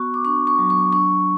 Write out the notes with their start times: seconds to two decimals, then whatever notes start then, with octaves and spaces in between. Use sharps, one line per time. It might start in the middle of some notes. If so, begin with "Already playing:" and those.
Already playing: B3 F#4 C#6
0.14 D6
0.25 D4 C#6
0.47 C#6
0.58 F#3
0.70 C#6
0.93 D4 C#6